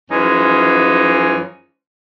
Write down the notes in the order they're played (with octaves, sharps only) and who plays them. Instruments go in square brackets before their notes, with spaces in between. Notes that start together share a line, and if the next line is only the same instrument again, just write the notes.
[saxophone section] F#2 E3 F3 G#3 C#4 D#4